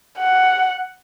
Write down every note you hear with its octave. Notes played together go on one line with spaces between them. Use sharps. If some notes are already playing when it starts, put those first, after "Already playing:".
F#5